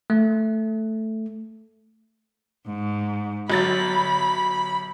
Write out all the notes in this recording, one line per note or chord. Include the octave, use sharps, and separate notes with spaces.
A3
G#2
G1 F#3 B5 A6